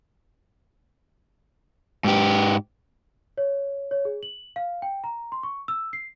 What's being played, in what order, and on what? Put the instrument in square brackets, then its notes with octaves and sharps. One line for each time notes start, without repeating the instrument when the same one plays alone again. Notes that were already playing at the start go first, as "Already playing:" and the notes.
[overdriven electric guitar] G#2 G4
[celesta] C#5
C#5
G#4
F#7
F5
G5
A#5
C6
C#6
E6
C7